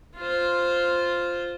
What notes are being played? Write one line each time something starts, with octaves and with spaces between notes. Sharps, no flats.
F4 C5